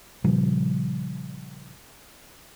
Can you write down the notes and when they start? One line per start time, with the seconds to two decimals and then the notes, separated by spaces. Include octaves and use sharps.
0.24 A#2 C#3 F3 G3